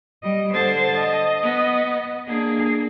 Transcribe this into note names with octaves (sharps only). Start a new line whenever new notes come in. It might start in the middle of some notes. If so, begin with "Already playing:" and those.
G3 D#5
D3 C5 A5
D#5
B3
A#3 D4 G#4